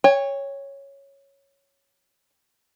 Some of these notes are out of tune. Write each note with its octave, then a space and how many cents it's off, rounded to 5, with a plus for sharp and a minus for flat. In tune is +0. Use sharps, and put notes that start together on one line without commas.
C#5 -5 G5 +40